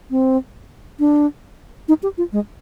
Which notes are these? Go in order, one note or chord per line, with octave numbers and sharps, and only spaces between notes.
C4
D4
D#4
G4
F4
G#3